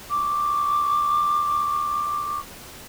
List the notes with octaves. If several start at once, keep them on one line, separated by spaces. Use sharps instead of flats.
C#6 D6